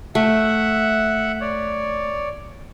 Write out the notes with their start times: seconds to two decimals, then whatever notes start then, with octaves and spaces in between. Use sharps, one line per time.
0.15 A3 E5 F#5
1.41 C#5 D5